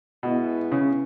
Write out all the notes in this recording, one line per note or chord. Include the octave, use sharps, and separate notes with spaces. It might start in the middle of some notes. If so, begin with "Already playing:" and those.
B2 G#3 B3 E4
C#3